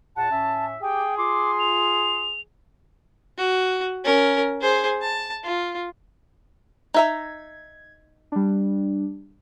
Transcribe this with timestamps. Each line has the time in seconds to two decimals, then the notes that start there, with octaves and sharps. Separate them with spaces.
0.17 E2 A#2 F#5 A5
0.31 A2 C#4 E5
0.82 G4 G#4 G5
1.18 F4 C6 D6
1.59 F7
3.38 F#4
4.05 C#4 A#4
4.61 G#4 C5
5.02 A5
5.43 F4
6.94 D#4 E5 A#5 G#6
8.32 G3 D4